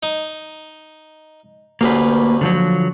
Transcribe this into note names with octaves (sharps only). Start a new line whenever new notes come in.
D#4
A1 D2 A#3 B4
D3 F3 F#3